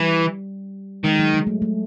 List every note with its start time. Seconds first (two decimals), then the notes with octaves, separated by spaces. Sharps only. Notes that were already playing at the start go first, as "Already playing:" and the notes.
Already playing: E3 G3
1.04 D#3 G#3
1.19 F#3
1.34 G#3
1.47 A3
1.62 A3